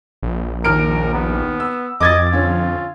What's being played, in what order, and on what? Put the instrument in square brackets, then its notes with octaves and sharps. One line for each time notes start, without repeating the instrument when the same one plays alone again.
[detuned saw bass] A#1
[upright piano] D#2 F6 D7 [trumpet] A#4
[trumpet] B3
[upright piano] E6
[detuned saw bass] F2 [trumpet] D#5 [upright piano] D6 G#6 A6
[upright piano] D3 C#4 [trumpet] F4